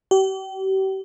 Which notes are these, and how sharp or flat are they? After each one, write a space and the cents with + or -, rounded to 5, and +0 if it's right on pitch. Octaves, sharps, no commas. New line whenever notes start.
G4 -40